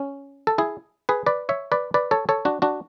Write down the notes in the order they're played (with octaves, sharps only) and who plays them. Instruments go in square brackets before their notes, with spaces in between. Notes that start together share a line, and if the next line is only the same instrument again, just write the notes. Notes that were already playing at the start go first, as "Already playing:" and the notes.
Already playing: [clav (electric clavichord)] C#4
A4
E4 G#4
G#4 B4
B4 D5
C#5 E5
B4 D5
B4 D5
A4 C#5
A4 C#5
D4 F#4
D4 F#4